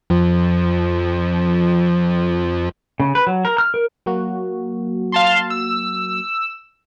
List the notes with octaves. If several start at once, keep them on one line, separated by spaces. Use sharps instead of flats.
F2 F3
C#3
B4
F#3
A#4
F6
A#4
F#3 A#3 F#4
F5 A5 C6
E6